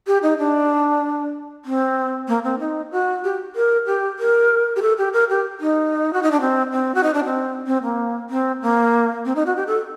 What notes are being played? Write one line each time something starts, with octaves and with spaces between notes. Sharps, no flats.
G4
D#4
D4
C4
A#3
C4
D#4
F#4
G4
A#4
G4
A#4
G4
A4
G4
A#4
G4
D#4
F#4
D#4
D4
C4
C4
F#4
D#4
D4
C4
C4
A#3
C4
A#3
C4
D#4
F#4
G4
A4